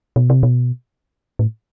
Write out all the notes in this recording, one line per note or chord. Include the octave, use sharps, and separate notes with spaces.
B2
C3
B2
A2